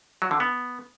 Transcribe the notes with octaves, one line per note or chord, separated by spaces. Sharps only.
F#3
D3
B3